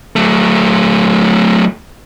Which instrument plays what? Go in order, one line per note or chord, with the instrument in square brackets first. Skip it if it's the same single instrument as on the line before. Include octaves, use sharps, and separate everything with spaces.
[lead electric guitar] F#3 A3